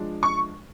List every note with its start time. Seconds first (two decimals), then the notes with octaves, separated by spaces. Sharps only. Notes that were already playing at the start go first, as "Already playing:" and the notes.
Already playing: F3 G#3 D4
0.23 C#6